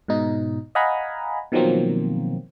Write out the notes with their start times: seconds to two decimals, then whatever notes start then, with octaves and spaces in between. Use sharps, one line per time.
0.08 G#2 B2 D#4
0.75 D#5 F5 F#5 G#5 A#5 B5
1.52 B2 D#3 F3 F#3 A#3 C4